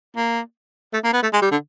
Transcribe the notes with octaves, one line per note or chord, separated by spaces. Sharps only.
A#3
A3
A#3
B3
A3
G#3
G3
D3